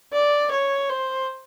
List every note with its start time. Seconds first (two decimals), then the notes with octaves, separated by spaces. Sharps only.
0.13 D5
0.51 C#5
0.89 C5